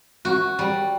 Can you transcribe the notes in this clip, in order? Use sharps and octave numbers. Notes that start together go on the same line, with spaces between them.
F#4
G3